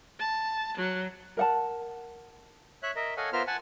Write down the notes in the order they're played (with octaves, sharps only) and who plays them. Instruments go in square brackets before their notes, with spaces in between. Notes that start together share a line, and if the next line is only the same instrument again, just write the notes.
[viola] A5
F#3
[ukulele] A#4 F#5 A5
[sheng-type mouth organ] C#5 E5 F#6
A#4 D#5 E5
A4 C#5 D#5 F5 F#5 G#5
B3 F4 A#4 C5 E5 F6
F#5 G#5 A5